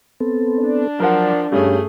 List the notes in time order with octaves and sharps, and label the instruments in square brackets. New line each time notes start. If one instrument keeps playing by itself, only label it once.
[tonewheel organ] B3 C4 A4
[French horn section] D4
[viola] F3 [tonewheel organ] F#3 [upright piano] A#4 C5 F#5
[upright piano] G2 C#4 [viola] A3 G#4 [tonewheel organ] G4